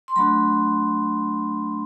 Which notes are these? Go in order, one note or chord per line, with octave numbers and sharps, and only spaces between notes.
C6
F#3 A3 D4 F#4 B5